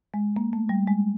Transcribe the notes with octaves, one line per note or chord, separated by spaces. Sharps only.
G#3
A#3
A3
G3
G#3